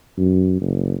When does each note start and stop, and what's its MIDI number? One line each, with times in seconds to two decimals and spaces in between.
0.17 0.59 42
0.61 0.97 30